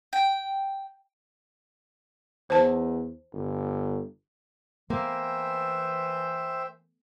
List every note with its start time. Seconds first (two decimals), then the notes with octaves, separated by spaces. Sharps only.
0.13 G5
2.50 E2 C5 A5
3.33 G1
4.90 E3 A#3 C5 E5 G5